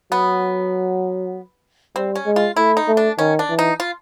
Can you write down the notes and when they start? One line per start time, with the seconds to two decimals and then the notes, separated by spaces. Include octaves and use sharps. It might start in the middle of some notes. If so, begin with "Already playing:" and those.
0.11 F#3 B3
1.96 G3 C4
2.15 C#4
2.26 G#3
2.36 F4
2.56 A3 E4
2.77 D#4
2.88 A3
2.97 D4
3.18 D#3 C#4
3.39 D4
3.49 E3
3.59 D#4
3.80 F4